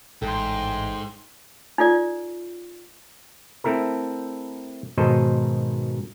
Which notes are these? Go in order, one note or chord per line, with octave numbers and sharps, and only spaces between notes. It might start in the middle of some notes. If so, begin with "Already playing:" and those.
A1 G#2 A4 G5 C6
D#4 F4 A4 D5
A3 C4 E4 A4 A#4
G#2 B2 D#3 A4 C5 D#5